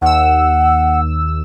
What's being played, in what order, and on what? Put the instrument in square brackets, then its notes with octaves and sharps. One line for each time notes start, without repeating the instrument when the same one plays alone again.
[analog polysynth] D#2 E6 [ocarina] F#5